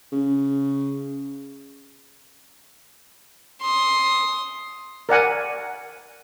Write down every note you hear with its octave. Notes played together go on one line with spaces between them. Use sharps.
C#3
C6 D#6
A#4 D5 F#5 G#5